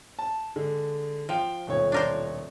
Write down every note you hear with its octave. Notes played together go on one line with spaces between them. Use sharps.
A5
D3 G#3
F3 F5 G5
D#1 B1 C#5
D4 A#4 C5